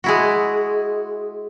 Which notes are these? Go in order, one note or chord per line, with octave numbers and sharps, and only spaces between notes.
G#3 E4 F#4